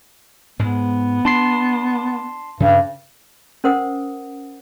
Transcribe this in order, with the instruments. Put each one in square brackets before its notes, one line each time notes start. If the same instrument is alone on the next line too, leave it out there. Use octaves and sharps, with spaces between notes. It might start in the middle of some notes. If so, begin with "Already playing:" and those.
[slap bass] G#2 G#3 [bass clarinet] B3
[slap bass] D4 [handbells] A5 C6 C7
[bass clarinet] G2 [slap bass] C#3
[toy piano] C#4 A#4 C5 F#5 D#6